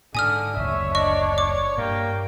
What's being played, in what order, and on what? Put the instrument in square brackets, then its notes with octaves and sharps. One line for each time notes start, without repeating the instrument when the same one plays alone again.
[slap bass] G#2 [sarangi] D3 [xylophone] G#5 D#6 F6
[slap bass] F#1 D2 [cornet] C#5 [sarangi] E5
[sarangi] D4 [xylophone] D#5 C#6
[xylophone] D6
[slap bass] G2 [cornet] A#3 [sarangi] G5